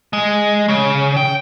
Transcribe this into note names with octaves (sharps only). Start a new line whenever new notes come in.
G#3
C#3
G5